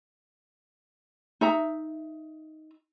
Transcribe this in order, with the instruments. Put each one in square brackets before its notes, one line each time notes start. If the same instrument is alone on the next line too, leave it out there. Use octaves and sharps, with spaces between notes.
[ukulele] D#4 E5 A#5